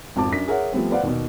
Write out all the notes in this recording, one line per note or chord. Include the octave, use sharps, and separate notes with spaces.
G#1 F2 A5 D6
F#2 D4 F#4 B6
G#4 A#4 C#5 E5 F#5
F3 G3 A3 B3 C4
B4 C5 D5 F5 F#5
D#2 B2